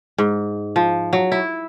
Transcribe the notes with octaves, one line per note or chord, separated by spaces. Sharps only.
G#2
F3
F#3
E4